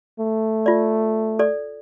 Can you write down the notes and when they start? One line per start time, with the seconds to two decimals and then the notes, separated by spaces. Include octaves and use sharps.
0.20 A3
0.66 F4 D5
1.39 A4 D5